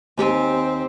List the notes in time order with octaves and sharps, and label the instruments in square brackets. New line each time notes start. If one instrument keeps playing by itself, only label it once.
[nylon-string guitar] D#2 G4 G#5 [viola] C4